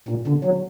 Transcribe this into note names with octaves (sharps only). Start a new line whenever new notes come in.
A#2
D3
F#3